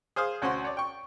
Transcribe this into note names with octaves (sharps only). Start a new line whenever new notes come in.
G#4 C5 F5 D#6
D2 C#4 F#4 C5 C6
C#5 D5
G5 C#6